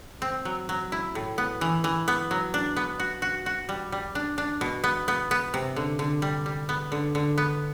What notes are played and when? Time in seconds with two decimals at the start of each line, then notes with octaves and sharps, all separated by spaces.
0.22 C4
0.45 F#3
0.69 F#3
0.92 E4
1.15 A2
1.38 B3
1.61 E3
1.84 E3
2.08 B3
2.31 F#3
2.54 D4
2.76 B3
3.00 F#4
3.22 F#4
3.46 F#4
3.69 G3
3.92 G3
4.15 D4
4.38 D4
4.61 B2
4.84 B3
5.08 B3
5.31 B3
5.54 C3
5.76 D3
5.99 D3
6.22 G3
6.46 G3
6.69 B3
6.92 D3
7.15 D3
7.38 B3